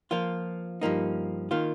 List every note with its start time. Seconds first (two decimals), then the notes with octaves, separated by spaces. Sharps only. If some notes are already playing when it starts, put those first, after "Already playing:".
0.11 F3 A#3 F4
0.81 G2 F3 A#3 D#4
1.51 D#3 A#3 F4